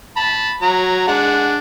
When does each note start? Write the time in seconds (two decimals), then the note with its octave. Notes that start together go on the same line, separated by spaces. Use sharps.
0.17 A5 B5
0.62 F#3 A#5
1.07 G#3 D4 F#5